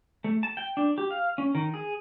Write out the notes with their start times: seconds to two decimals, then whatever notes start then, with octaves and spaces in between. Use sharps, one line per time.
0.24 A3
0.43 A5
0.57 G5
0.77 D4
0.98 G4
1.11 F5
1.38 C#4
1.55 D#3
1.74 G#4